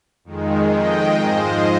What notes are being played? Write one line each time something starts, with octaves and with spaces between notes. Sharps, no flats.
F2 D#3 G#3
D#5 G5
G#2 F3 G#3 C5 D#5